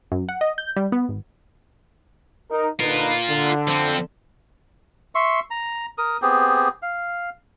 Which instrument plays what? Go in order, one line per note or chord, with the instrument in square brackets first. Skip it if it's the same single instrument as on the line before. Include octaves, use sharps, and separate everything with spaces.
[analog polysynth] F#2
F#5
D#5
G6
G3
B3
G#1
[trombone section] D#4 A#4
[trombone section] D3 D#4 B4 [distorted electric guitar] F4 A#4
[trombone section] D3
[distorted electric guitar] F3 C4
[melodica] E5 C6 C#6
A#5
A#4 D#6
B3 C4 G4 G#4
F5